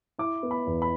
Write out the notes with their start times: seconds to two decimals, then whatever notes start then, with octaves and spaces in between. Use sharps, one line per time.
0.19 E4 D6
0.43 B3
0.51 B5
0.66 E2
0.82 B5